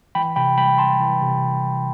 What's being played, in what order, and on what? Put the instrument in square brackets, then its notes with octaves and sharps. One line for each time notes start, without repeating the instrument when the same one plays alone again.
[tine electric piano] E3 G5 B5
C3 G5 B5
G3 G5 B5
C3 A5 C6
E3
C3